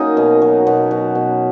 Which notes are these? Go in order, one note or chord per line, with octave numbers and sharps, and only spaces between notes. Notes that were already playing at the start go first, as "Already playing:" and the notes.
Already playing: F#3 A#3 C#4 D#4
B2
F#3
B2
F#3
B2